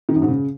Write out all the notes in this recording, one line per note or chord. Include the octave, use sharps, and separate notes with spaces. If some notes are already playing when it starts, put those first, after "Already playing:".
D#3
F#2
G#2
C#3